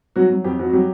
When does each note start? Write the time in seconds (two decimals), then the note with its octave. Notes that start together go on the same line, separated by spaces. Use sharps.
0.16 F#3 F#4
0.30 F#3
0.44 F2 G4
0.59 F2 F#4
0.70 F#4
0.73 F#3 G4